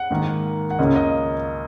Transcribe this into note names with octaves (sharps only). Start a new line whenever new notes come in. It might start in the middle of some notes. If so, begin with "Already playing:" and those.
Already playing: F#5
G#2 D#3 A#3
F#5
C#2 C#3 A#3 C#4 D#5
D#5